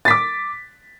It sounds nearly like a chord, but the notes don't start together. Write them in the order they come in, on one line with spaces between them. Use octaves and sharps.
A6 B6 D6